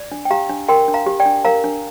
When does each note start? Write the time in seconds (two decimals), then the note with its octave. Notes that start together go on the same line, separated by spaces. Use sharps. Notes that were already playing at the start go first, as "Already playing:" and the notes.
Already playing: D5
0.12 D4
0.25 G5
0.31 G4 F5 A#5
0.49 D4
0.68 A#4 G5 C6
0.88 D4
0.94 F5 A#5
1.06 G4
1.20 D5 G5
1.26 D4
1.45 A#4 F5 A#5
1.64 D4